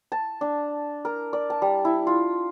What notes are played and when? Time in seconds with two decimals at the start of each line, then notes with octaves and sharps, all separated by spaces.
0.12 A5
0.41 D4
1.05 A#4
1.33 D5
1.50 A5
1.62 G3
1.85 E4
2.07 F4